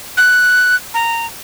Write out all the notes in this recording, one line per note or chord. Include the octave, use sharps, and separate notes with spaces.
F#6
A#5